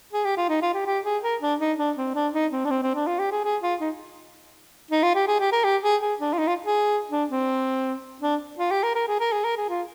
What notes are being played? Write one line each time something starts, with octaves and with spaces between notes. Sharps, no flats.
G#4
G4
F4
D#4
F4
G4
G4
G#4
A#4
D4
D#4
D4
C4
D4
D#4
C4
D4
C4
C4
D4
F4
G4
G#4
G#4
F4
D#4
D#4
F4
G4
G#4
G4
A#4
G4
G#4
G#4
D4
F4
D#4
F4
G#4
D4
C4
D4
F4
G4
A#4
A#4
G#4
A#4
G#4
A#4
G#4
F4